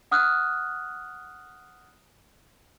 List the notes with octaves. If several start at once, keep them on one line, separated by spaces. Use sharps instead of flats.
F#5 D#6 F6 F#6